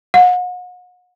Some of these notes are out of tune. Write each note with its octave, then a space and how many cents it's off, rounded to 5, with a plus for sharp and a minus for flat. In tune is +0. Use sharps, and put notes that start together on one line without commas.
F#5 -40